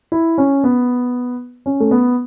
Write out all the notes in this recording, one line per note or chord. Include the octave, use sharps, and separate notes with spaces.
E4
C#4
B3
C#4
A3
B3